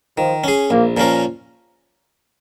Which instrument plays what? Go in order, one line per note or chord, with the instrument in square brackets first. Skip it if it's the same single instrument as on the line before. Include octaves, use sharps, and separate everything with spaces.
[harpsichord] D#3 [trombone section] F3
[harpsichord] C#4 G#4
[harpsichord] A#1 [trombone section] A#3
[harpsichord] A#2 F3 C#4 A#4